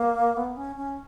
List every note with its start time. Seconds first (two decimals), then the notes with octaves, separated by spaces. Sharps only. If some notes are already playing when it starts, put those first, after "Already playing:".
Already playing: A#3
0.37 B3
0.57 C#4
0.76 C#4